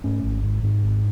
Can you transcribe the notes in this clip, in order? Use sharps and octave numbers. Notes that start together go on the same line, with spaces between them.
G#2 A3 C#4
G#1
G#2
G#2
G#1